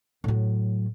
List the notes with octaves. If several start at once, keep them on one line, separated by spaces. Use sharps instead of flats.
A2 F#3